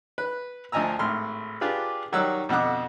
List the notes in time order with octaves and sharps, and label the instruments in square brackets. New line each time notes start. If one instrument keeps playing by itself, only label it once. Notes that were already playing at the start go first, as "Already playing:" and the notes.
[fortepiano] B4
D2 F3 D#5 G#5 A#5 E6
G#1 A2 C6 F6
D4 F4 G4 G#4 B4
D#3 F#3 G3 C#5 E6 F#6
F2 B2 D3 F#5 D6